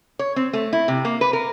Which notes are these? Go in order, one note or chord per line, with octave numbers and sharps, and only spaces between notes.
C#5
C4
A3
E4
C3
A#3
B4
A#4